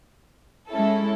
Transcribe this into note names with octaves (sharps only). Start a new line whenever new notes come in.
G#3 C#4 E4 A4